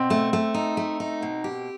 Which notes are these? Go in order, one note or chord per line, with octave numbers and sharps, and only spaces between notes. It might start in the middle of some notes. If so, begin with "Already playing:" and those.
Already playing: B2 C4
A3
A3
D#4
A3
D#4
B2
G4